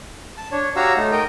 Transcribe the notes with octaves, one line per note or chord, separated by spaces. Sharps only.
A5
D4 C#5
F#4 G4 C#5 F5 A#5 E6
A3 D#4
A#4 D#5 G5